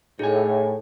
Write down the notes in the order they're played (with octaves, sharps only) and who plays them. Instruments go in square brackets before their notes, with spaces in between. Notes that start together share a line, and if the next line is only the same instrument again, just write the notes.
[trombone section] A2 [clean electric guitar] D#4 G#5 [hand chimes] G#4